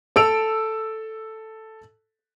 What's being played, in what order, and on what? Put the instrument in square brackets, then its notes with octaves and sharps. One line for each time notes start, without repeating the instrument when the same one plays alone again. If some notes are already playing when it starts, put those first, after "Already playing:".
[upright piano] A4 E6 D7 F7